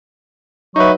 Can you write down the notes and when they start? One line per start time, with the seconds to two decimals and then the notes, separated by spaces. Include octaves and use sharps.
0.76 F#3 D#4 B4 E5 C#6